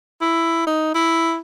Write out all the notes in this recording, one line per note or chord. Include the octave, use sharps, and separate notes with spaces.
E4
D#4
E4